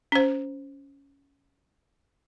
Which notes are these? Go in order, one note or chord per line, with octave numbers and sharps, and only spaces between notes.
C#4 C5